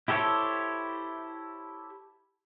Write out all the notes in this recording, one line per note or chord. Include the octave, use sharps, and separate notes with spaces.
E4 G4 A4 C5 C#5